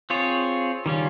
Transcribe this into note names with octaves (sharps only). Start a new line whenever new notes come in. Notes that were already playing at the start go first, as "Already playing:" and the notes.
C4 F4 G#4 C#5
D#3 G3 C#4 F4